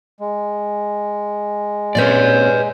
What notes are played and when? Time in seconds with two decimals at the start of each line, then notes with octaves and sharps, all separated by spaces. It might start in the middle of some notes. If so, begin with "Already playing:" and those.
0.20 G#3
1.95 A#2 C4 C#4 B4 D5